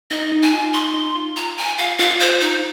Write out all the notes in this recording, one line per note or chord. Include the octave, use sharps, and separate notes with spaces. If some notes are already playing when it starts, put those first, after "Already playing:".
D#4 D#5
D#4
G#5
F4
D#4 C6
D#4
F4
A#5
G#5
F5
F4 F5
C5
D#4